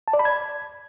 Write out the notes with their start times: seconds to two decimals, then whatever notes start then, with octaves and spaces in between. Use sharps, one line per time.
0.08 A5
0.13 D5
0.19 B5
0.25 G#6